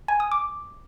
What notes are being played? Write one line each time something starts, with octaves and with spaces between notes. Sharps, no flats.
G#5
D#6
D6